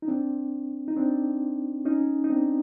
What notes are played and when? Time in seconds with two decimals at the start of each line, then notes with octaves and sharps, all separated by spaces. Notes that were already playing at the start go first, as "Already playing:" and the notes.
0.02 D#4
0.08 C4 D4
0.88 D#4
0.97 C4 D4
1.85 C#4 D#4
2.24 D#4
2.30 C4 D4